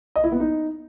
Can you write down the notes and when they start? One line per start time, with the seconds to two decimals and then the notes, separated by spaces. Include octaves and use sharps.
0.16 D#5
0.24 E4
0.32 B3
0.40 D#4